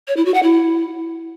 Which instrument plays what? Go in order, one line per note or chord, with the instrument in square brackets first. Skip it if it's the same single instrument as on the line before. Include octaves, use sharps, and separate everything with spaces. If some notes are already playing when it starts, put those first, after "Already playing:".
[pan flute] C#5
E4
F#4
F#5
E4